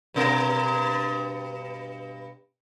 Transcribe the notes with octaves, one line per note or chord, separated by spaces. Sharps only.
G2 B2 A#4